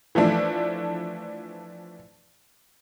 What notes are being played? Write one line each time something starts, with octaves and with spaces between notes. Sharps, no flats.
E3 F3 A3 D4 E4